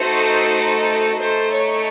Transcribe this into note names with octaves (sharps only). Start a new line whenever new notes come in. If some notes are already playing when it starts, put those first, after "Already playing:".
Already playing: A3 D#4 F#4 A4 C5
A3 D#4 A4 C5
C#5